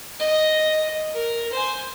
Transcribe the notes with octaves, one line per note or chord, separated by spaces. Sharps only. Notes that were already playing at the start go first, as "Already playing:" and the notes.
D#5
A#4
C5 G#5